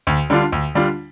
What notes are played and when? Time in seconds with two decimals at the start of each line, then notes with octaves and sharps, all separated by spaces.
0.07 D2
0.30 D3 G3 D4 F4
0.52 D2
0.75 D3 G3 D4 F4